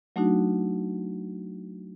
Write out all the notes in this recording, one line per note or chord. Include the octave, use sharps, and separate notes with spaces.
F#3 A3 D4 D#4 F#4